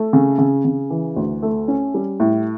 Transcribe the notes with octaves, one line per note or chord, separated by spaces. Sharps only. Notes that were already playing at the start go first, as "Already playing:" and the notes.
Already playing: A3
C#3
C#3
C#3
E3
D2
A3
C#4
G3
A2